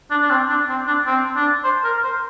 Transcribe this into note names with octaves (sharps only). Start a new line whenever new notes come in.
D4
D4
C4
D4
C4
D4
C4
D4
C5
A#4
C5